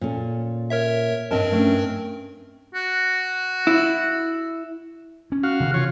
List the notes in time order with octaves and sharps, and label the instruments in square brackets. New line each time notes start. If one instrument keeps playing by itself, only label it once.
[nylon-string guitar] A#2 C#4 A4
[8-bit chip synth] A#4 C#5 E5
[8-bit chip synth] G2 C4 A#4 [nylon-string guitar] D#5 A5
[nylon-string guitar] A3 C#4 D4
[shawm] F#4
[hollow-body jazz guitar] E4
[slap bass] C#4
[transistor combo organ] F#4 F5
[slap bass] C3 D#3 E3
[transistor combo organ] F4 C#5